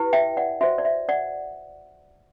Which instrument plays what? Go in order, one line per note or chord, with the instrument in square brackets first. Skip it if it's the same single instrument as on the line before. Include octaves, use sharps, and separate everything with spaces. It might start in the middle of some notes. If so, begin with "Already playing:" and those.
Already playing: [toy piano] E4 G4 B4
E5 G5
D5 F#5
F#4 C5 E5
D5
E5
D5 F#5